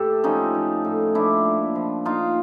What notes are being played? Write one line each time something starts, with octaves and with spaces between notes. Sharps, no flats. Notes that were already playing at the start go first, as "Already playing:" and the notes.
Already playing: A2 G4 A4
F3 C#4 D#4
F3
A2
F3 D4 E4
A#2
F3
A#2 D#4 F4